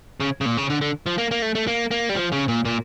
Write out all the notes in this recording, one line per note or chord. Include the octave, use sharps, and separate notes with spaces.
C#3
C#3
A#2
C#3
D3
D3
F3
A#3
A#3
A3
A3
A#3
A#3
G3
F3
C#3
A#2
A#2